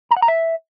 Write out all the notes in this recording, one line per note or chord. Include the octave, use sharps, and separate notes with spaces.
A#5
F#5
A#5
E5